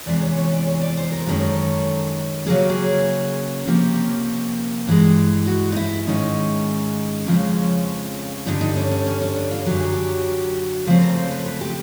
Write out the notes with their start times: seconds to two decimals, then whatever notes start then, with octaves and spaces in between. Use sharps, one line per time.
0.06 E2 C3 E3 G#3 D5
0.22 C#5
0.37 C#5
0.52 D5
0.67 C#5
0.82 D5
0.97 C5
1.12 A#4
1.26 F#2 D#3 G#3 C#4 A4
2.46 C#3 F#3 A#3 C#4 G#4
2.58 G4
2.70 G#4
3.67 C3 F3 A#3 C#4 G4
4.87 G2 E3 G#3
5.46 F#4
5.72 D#4
5.76 E4
6.07 G#2 D#3 G#3 C#4 D#4
7.27 F2 C#3 F3 G#3 C#4
8.46 G2 D3 G3 D#4
8.61 D#4
8.76 C#4
8.91 C#4
9.06 C#4
9.22 C#4
9.36 D4
9.51 F4
9.66 F#2 D3 F#3 G4
9.80 G#4
9.93 G4
10.87 C#3 F3 A3 C4 C5
11.01 A#4
11.16 C5
11.31 B4
11.46 B4
11.61 G4